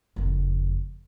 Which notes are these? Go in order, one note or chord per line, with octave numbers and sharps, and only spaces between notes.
F#1 F2